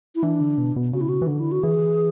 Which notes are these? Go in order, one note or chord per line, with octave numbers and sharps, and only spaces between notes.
E4
E3 D4
D3
B2
B2
C#3 F#4
E4
F#4
E3
D3 D4
E4
F#4
E3 G#4